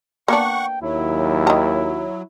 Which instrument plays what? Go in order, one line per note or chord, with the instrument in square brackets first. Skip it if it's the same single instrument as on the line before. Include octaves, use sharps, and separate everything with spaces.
[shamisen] A#3 B3 D4 [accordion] F#5 C#6 [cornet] G5
[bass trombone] D#2 [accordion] F#3 [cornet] E4
[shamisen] D#3 A#5